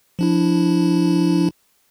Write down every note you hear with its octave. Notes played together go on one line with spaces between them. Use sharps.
F3 D4 E4